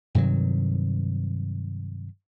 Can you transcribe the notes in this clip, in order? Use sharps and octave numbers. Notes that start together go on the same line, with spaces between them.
G2 C3 D#3 F#3